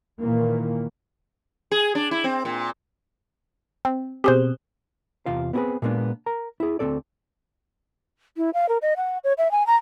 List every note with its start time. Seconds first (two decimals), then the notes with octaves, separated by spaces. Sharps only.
0.21 A#2 D#3 E3 A#3
1.71 G#4
1.95 D4
2.11 E4
2.24 C4
2.45 A#2
3.85 C4
4.24 B2 C4 G4 G#4 C5
5.26 E2 C3 F4 F5
5.53 B3 C4 E4 G4 G#4 B4
5.82 A#2 G#3 A#3 B3 D4
6.26 A#4 A#5
6.60 E4 G#4
6.79 D2 B2 C4 A4 D5
8.37 E4
8.54 F5
8.69 A#4
8.82 D#5
8.97 F#5
9.24 C#5
9.38 E5
9.51 G#5
9.67 A#5